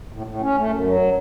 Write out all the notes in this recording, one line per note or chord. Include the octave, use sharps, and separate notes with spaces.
A2
A2
C#4
A3
F#2
F#3